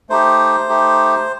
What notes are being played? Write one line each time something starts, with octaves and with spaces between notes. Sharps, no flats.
A3 D#4 G4 C5
A3 D#4 G4